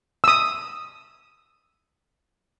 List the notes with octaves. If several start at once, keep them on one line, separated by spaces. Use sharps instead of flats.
D#6 E6